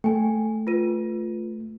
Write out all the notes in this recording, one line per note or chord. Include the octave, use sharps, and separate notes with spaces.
A3 G5 G#5
F4 B4 D#7